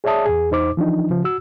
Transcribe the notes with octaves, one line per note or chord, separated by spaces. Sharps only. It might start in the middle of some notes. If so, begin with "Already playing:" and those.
G#4 C#5 D5 E5 A5 D#6
E2 G#4
E2 D#4 C5 D6
E3 F3 D4 D#4
C#3 F3
F#4 E6